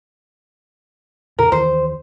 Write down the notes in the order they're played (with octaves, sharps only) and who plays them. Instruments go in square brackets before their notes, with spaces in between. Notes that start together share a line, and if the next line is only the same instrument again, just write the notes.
[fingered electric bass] E2 A#2 C#3 [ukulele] A#4
[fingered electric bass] D#2 D#3 E3 [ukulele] C5